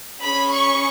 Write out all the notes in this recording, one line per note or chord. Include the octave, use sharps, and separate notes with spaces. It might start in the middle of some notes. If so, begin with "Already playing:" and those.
C#4 G#4 B5
C#6